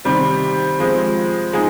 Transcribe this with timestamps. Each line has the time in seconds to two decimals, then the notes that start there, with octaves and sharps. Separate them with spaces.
0.05 C3 D#3 G3 C4
0.79 F3 G#3 C4
1.53 F3 G#3 D#4 G#4